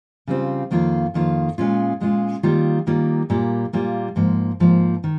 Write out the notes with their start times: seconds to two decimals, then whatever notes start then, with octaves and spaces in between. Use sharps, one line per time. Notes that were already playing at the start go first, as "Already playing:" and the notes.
0.27 C#3 G3 C4 F4
0.71 F2 D#3 A#3 F4
1.14 F2 D#3 A#3 F4
1.58 A#2 G#3 C#4 F4
2.00 A#2 G#3 C#4 F4
2.43 D#3 G3 A#3 F4
2.87 D#3 G3 A#3 F4
3.30 A#2 G3 A#3 F4
3.73 A#2 G3 A#3 F4
4.16 G#2 F3 A#3
4.60 G#2 F3 A#3
5.04 D#3